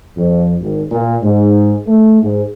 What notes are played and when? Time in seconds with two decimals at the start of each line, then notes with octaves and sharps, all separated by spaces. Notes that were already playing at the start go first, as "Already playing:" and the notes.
0.17 F2
0.61 G#1
0.91 A#2
1.22 G#2
1.85 A3
2.22 G#2